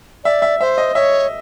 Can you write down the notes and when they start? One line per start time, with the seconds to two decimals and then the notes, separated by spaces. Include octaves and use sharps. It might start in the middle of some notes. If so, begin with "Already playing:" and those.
0.24 D5 E5
0.42 E5
0.61 C5 E5
0.78 D#5
0.95 C#5 E5